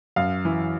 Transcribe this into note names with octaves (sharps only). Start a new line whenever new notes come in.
F#2 F5
E3